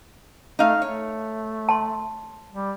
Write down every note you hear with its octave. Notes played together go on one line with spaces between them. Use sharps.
A3 D#4 F5
A3 C#5
A5 C6
G3